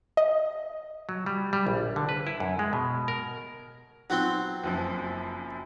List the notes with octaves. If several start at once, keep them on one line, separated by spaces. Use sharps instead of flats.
D#5
F#3
G3
G3
A#1
D3
B4
E4
F#2
G#3
B2
A#4
F#3 B3 C4 D#4 F4 G7
F#1 F#2 F3